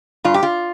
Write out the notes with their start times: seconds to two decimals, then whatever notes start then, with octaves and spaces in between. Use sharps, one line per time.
0.24 G2 F4
0.34 G4
0.43 F4